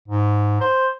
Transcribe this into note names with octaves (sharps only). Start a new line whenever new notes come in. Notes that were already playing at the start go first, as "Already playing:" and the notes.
G#2
C5